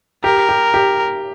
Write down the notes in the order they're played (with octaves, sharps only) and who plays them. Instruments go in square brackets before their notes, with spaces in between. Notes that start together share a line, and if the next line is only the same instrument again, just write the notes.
[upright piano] G4 [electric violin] A#4
[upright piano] G4
G4